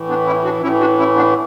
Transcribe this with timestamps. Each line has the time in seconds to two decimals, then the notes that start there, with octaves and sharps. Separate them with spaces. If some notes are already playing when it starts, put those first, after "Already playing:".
Already playing: A2 E3
0.08 B3 D4
0.26 C#4 E4
0.44 D4 F#4
0.63 A2 C#4 E4
0.67 E3
0.80 D4 F#4
0.98 C#4 E4
1.16 B3 D4